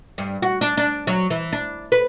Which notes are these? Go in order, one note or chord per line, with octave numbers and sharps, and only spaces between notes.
G2
F#4
D4
D4
F#3
E3
D4
B4